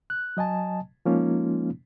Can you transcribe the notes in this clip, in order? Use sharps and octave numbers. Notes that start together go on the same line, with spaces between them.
F#6
F#3 D#5 G#5 A5
F3 G#3 A#3 C#4 D#4 F4